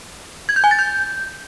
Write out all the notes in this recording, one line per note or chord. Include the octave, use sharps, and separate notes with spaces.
G#6
G6
G#5
A6
G6